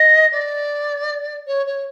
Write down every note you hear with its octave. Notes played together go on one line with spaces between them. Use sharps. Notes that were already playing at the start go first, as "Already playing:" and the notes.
Already playing: D#5
D5
C#5
C#5